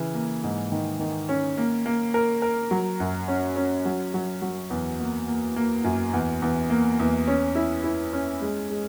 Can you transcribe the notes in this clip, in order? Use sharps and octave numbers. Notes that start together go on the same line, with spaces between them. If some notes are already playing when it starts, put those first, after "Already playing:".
Already playing: C#3 E3
A#3
G#2
D#3
D#3
C#4
A#3
A#3
A#4
A#4
F#3
F#2
C#4
C#4
F#3
F#3
F#3
E2
A#3
A#3
A#3
F#2
E2
E2
A#3
E2
C#4
E4
E4
C#4
G#3
G#3